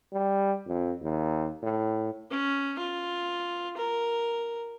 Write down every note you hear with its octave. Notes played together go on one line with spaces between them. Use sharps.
G3
F2
D#2
A2
C#4
F4
A#4